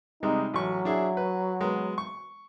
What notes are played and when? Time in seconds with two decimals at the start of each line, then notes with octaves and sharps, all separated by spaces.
0.23 C3 G3 G#3 D#4
0.54 A1 F#3 C#6
0.85 D4 E4 G#4
1.17 B4
1.61 G#3 B3
1.98 C#6